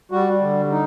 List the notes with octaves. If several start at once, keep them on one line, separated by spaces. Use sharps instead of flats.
G3 F#4
D3
D#4